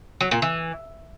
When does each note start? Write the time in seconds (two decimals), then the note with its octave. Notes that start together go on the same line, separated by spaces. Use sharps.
0.21 F#3
0.31 A#2
0.42 E3